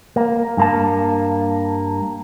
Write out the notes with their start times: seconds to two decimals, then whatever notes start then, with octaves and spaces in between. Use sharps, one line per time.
0.16 A#3
0.57 G2 A#3 A5